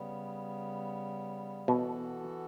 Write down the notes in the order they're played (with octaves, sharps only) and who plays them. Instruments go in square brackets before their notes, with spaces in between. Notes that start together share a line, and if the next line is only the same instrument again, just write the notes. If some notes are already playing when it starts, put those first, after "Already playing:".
Already playing: [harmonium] C#3 G3 B3
[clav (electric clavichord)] B2 [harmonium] E3 B3 F#4 A4